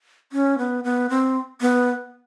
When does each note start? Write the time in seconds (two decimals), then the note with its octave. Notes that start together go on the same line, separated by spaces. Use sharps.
0.32 C#4
0.58 B3
0.84 B3
1.10 C4
1.61 B3